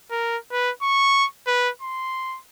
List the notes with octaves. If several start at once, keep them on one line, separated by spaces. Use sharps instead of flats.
A#4
B4
C#6
B4
C6